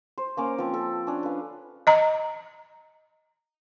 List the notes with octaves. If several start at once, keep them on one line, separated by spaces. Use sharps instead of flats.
C5
A#3 C#4 D6
F3 C4
A4
C#4 D4
B4 F5
D#5 A#5